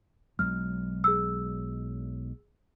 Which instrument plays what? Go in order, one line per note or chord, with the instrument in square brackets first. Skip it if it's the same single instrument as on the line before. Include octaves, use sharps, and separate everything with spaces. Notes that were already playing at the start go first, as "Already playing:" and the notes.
[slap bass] B1 F#3 G#3 [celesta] F6
[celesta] G#4 E6